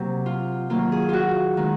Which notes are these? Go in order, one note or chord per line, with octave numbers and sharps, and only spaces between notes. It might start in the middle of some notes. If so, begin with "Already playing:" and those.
Already playing: C3 F#3 A#3
F4
D#3 F#3 A#3 F4
G#4
F4 F#4
D#3 G#3